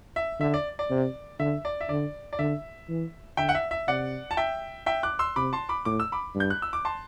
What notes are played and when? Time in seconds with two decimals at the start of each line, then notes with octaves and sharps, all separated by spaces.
0.16 E5
0.40 D3 E5
0.54 D5
0.79 D5
0.91 C3
1.39 D3 E5
1.65 D5
1.81 E5
1.89 D3 D5
2.33 D5
2.39 D3 E5
2.89 E3
3.37 D3 E5 G5
3.49 F#5
3.55 E5
3.71 E5
3.88 C3 D5 F#5
4.31 A5
4.37 E5 G5
4.86 E5 G5
5.03 D6 F#6
5.19 C6 E6
5.36 C3 B5 D6
5.53 A5 C6
5.69 B5 D6
5.85 A2 D6
6.00 E6
6.12 B5 D6
6.35 G2
6.40 G6
6.50 F#6
6.62 E6
6.73 D6
6.85 A5 C6